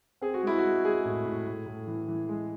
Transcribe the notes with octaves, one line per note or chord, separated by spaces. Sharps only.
C4 G#4
F#4
G#3 E4
G#3 F#4
G#3 G#4
A2
A2
A2
A2
E3
E3
G#3